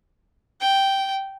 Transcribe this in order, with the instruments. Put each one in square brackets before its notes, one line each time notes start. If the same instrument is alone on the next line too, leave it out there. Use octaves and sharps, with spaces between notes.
[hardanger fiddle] G5